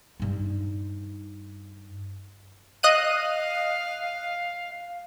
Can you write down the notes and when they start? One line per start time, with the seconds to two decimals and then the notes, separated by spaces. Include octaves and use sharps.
0.20 G2 D#4
2.83 D#5 F5 F#6 D#7